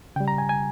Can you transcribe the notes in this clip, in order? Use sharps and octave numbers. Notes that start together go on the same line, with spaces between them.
C#3 G3 G5
A#5
G#5
G#5